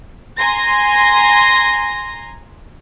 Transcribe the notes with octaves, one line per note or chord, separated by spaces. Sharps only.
G#5 A#5 C6 A#6